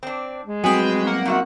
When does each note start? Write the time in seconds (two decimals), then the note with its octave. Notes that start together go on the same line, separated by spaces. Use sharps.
0.03 C4 D4
0.45 G#3
0.64 F#3 G3 C4 F#4 G#4 B4 G5
1.06 A#3 A#4 F#5
1.25 G#2 F#4 E5